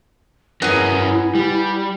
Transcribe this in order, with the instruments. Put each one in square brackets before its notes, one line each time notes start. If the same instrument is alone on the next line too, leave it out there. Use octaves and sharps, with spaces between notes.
[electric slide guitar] G2 C#4 A#4 [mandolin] B3 G#4 [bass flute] E4
[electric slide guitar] G3